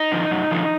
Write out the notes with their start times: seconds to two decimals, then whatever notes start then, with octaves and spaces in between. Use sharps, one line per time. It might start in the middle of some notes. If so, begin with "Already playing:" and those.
Already playing: D#4
0.12 D3 F3
0.31 F#2
0.52 D3 F3